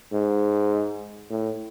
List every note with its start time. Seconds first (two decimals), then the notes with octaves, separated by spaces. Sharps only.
0.13 G#2
1.30 A2